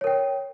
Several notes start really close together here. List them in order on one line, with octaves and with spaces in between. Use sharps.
C#5 A#4 G5